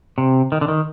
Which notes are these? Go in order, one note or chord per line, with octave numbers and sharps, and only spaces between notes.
C3
D#3
D3
D#3